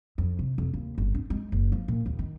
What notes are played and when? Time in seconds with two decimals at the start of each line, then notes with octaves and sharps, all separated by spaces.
0.18 F2
0.39 C3
0.58 F1
0.74 D#2
0.98 G1
1.14 D4
1.30 G#3
1.52 F#1
1.72 F3
1.88 A#2
2.06 D#2
2.19 D#3